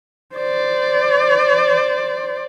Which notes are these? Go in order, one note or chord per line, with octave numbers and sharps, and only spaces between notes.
C5 D5